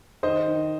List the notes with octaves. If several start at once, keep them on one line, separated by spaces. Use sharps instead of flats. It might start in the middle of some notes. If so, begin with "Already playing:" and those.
D#3 C5 D#5
D#3